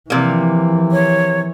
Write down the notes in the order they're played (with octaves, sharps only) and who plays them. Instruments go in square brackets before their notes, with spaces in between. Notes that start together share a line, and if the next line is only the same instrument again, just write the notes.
[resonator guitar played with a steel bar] C3 A#3 [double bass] E3 F3
[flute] C#5